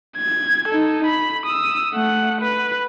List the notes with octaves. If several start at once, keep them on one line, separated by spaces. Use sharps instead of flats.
G#6
D#4 A4
B5
D#6 E6
A3 F#5
B4